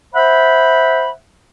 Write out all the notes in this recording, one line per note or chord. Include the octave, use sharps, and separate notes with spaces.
C5 E5 F#5 B5